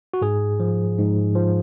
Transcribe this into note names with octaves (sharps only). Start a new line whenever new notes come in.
F#4
G#2 G#4
F3
G#2
F3